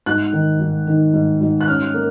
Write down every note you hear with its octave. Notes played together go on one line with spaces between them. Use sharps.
G#2 F#6
D#3
G#2
D#3
G#2
G#2
F#6
C#4 F6
A#3